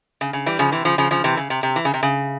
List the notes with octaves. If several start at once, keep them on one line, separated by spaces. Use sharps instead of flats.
C#3
C#3
E3 G3
C#3 F3
C3 E3
C#3 F3
C#3 F3
C#3 F3
C3 E3
C#3
C3
C3
E3
C#3
C3
C#3